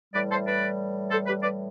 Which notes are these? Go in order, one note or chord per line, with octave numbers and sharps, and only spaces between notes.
A2 E3 G3 B4 D5
A4 C5
B4 D5
A4 C5
G4 B4
B4 D5